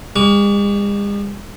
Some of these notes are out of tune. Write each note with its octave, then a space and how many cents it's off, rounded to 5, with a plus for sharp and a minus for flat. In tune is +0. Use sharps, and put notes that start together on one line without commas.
G#3 -45 C#6 +40